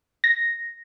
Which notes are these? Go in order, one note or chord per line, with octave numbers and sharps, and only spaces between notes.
A#6